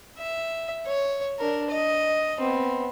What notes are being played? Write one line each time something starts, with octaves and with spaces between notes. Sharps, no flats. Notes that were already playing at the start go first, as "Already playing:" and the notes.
E5
C#5
D4 A#4
D#5
B3 C4